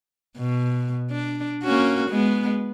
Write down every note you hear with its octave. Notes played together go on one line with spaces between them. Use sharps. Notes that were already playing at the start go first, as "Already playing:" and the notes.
B2
D4
A#3 C#4 F#4
G#3 B3